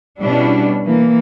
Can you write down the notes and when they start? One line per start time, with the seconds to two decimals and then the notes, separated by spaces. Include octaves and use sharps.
0.20 B2 G3 C#4 D4 E4
0.85 E3 A#3